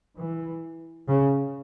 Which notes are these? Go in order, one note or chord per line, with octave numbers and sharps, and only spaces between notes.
E3
C#3